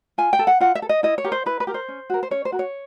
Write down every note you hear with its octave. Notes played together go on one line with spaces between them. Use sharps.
F4 G#5
G5
A4
F#5
F4 F#5
E5
A4
D#5
E4 D#5
C#5
G4 A#4
C5
E4 B4
B4
G4 A#4
C5
C#4
F#4 A#4
C5
C#4 C#5
C5
F#4 A#4
C#5